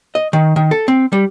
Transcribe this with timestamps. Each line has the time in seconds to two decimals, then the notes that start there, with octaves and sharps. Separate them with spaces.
0.15 D#5
0.33 D#3
0.56 D#3
0.71 A4
0.88 C4
1.13 G3